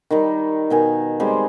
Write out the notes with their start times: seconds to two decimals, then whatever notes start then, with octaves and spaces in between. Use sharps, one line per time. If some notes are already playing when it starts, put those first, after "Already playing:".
0.11 D#3 G3 D#4
0.70 B2 D#3 G#5
1.20 G3 G#3 C4 G4